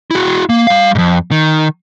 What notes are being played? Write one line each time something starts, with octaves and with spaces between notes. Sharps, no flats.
E4 F#4
A#3
G3 F5
F2 G#2
D#3